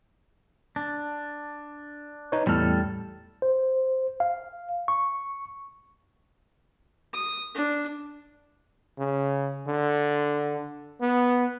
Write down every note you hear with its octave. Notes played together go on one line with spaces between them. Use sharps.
D4
D#4 B4 C#5
E2 A2 G3 A4 F6
C5
F5
C#6
D#6
D4
C#3
D3
B3